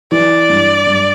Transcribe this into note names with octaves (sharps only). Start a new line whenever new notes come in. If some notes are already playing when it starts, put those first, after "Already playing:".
E3 D5
G2
G2